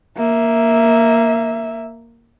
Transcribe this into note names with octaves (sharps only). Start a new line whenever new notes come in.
A#3 E5